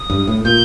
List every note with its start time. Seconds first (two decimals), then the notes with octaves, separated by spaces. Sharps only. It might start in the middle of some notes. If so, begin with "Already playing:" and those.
Already playing: D#6
0.10 G2
0.28 A2
0.45 A#2 G6